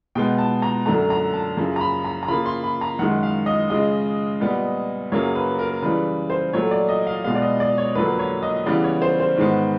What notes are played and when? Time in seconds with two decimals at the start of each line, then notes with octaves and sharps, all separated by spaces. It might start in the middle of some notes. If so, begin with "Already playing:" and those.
0.15 B2 G#3 B3 G5
0.38 A5
0.62 A#5
0.86 F#2 D3 F#3 A3 A#5
1.10 A#5
1.33 A5
1.57 F#2 C#3 F3
1.76 A#5
1.81 B5
2.04 A#5
2.23 A#5
2.28 C#3 F3 A#3 B5
2.46 C6
2.64 B5
2.81 A#5
2.99 F#2 D#3 G#3 F#5
3.23 F5
3.46 D#5
3.70 C#3 F3 G#3 D#5
4.40 A#2 G3 B3
5.12 F#2 C#3 F#3 A#3 C#5
5.35 B4
5.59 A#4
5.82 C#3 E3 G3 B4
6.30 C5
6.53 A#2 F#3 A3 C#5
6.71 D5
6.89 D#5
7.07 F5
7.24 B2 G#3 B3 F5
7.35 D5
7.42 D#5
7.60 D5
7.78 C#5
7.95 F2 D3 F#3 A#3 B4
8.19 C#5
8.43 D#5
8.66 C#3 E3 G3 B3 D5
8.84 C#5
9.02 C5
9.20 C5
9.37 G#2 D#3 G#3 B3